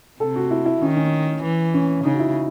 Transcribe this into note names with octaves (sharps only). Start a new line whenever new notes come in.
C3 A4
F#4
E4
E4
D#3 C#4
C#4
E3
C#4
C#3 D#4
F#4
E4